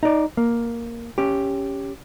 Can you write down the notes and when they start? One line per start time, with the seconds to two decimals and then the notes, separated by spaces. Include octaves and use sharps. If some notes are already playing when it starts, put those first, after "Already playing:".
0.03 D#4 D5
0.37 A#3
1.18 C#4 G4